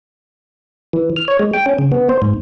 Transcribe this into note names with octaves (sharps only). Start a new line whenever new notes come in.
E3
F6
C#5
G#3
G5
C#4
C#3
B3
C5
G#2